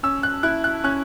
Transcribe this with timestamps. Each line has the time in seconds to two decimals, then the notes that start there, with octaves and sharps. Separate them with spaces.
0.03 C#4 E6
0.23 F#6
0.43 E4 F#6
0.64 F#6
0.84 C#4 F#6